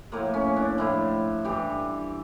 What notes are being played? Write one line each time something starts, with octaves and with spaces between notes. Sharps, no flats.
A2 F3 A#3
C#4
D4
A2 F3 E4
G2 E3 G4